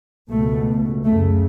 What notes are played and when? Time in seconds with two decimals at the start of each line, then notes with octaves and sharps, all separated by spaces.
0.30 C#2 B2 A3
1.04 F#2 C#3 A3